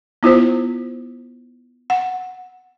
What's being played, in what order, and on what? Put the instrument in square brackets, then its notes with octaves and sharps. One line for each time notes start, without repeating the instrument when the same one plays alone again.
[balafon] B3 E4 F4 C5
F#5